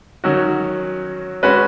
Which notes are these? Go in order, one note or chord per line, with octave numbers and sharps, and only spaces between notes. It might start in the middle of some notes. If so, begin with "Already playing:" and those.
D#3 F#3 C#4 F#4
G#3 C#4 F#4 B4